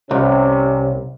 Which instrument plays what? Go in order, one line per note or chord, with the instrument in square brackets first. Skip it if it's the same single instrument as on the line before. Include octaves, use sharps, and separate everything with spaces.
[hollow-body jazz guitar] C2 [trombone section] C3 C#4